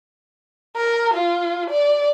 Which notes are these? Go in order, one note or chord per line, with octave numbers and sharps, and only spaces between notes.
A#4
F4
D5